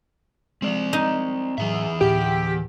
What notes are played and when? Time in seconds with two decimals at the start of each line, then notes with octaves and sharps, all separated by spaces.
0.62 F3 G#3 C4 D5
0.93 D#4
1.58 A2 E3 F#3 G#4 E5
2.01 D2 A2 G4